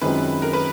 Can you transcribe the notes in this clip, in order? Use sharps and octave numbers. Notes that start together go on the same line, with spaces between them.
F#2 D#3 G#3 C4 F4 B4
A#4
B4